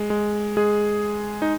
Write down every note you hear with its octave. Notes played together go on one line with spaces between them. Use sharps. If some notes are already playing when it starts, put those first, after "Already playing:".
Already playing: G#3
G#3
G#3 G#4
D#4